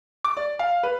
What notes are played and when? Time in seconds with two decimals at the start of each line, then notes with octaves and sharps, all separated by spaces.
0.24 D6
0.37 D5
0.59 F5
0.83 B4